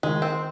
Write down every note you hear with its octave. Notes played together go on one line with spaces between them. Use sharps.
D#3 G#3
C4